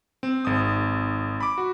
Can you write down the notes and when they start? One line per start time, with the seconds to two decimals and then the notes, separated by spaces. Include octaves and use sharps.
0.23 C4
0.45 G#1 D#6
1.40 B5 D6
1.58 F#4